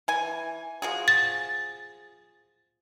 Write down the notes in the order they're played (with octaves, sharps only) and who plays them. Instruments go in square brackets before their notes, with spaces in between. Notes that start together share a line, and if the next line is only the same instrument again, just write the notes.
[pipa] E3 G#5
F3 F#4 G#4
[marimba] A6